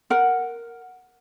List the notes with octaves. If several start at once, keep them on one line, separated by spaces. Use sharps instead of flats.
A#4 F#5